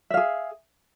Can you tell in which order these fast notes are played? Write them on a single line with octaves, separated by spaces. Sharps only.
E5 F5 G#4